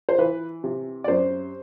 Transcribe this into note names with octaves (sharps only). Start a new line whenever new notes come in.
C5
E3 B4
C3
D5
F#2 C5